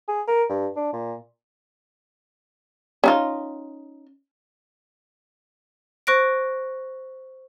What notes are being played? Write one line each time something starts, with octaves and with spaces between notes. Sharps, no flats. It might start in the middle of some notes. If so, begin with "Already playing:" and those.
G#4
A#4
G2
D4
A#2
C#4 D#4 F4
C5 C#6 F#6 A#6 D7